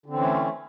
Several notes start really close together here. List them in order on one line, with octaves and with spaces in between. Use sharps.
D3 C4 E3 C#4 A3